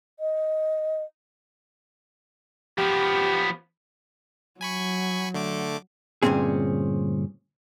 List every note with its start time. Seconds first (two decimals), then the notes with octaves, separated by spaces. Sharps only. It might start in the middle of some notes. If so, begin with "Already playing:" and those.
0.20 D#5
2.78 F3 B3 G4
4.61 F#3 G#5 B5 C#6
5.34 D3 A3 D6
6.23 D2 G2 A#2 C4 C#4 G#4